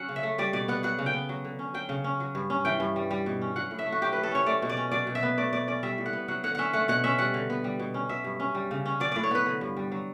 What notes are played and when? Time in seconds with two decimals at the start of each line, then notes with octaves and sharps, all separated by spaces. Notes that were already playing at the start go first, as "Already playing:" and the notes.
Already playing: F#3 C#4 F#5
0.09 C#3
0.16 E5
0.23 A3
0.38 G3 D5
0.53 B2 D5
0.68 B3 F#5
0.83 F#3 F#5
0.98 C#3
1.06 G5
1.14 B3
1.29 F#3
1.44 D3
1.59 C#4
1.74 F#3 G5
1.89 C#3
2.04 C#4
2.20 F#3
2.35 G2
2.50 C#4
2.65 E3 G5
2.80 G2
2.96 G3
3.11 G3
3.26 B2
3.41 C#4
3.56 F#3 F#5
3.71 A2
3.79 E5
3.86 A3
3.92 F#4
4.02 F#3 G4
4.13 A2 B4
4.23 A4
4.31 C#4 C#5
4.46 A3 D5
4.62 B2
4.69 D5
4.77 C#4
4.92 F#3 D5
5.07 B2
5.15 E5
5.23 B3
5.37 A3 D5
5.53 B2 D5
5.67 C#4 D5
5.83 G3 E5
5.98 A2
6.06 F#5
6.13 B3
6.28 F#3 F#5
6.44 D3 F#5
6.55 C#4 E5 F#5
6.73 A3 F#5
6.88 B2 F#5
7.04 C#4 E5
7.18 G3 F#5
7.34 D3
7.50 B3
7.64 G3
7.79 B2
7.94 C#4
8.09 F#3 E5
8.24 G2
8.40 C#4
8.55 G3
8.71 C#3
8.86 C#4
9.00 F#3 D5
9.12 A2 D5
9.23 C#5
9.31 B3 B4
9.46 D3
9.61 G2
9.76 G3
9.92 F#3